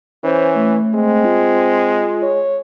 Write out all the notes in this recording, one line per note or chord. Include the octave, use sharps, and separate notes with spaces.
E3 C#4 C5
A3
G#3 C4
F4
C#5